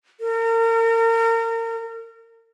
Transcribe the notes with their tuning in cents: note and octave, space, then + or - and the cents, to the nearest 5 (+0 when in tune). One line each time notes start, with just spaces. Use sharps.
A#4 -35